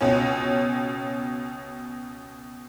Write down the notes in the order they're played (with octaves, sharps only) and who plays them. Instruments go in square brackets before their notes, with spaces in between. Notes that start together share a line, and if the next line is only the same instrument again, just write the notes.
[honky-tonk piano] C#2 B2 C#4